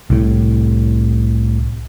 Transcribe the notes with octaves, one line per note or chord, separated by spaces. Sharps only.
C2 A2